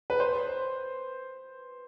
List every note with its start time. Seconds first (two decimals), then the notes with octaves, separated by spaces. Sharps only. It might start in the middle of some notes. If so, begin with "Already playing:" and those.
0.10 B4
0.20 C5